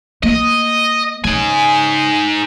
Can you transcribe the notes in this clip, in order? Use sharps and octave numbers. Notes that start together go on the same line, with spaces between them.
A#3 D#5
C#3 D#4 G#5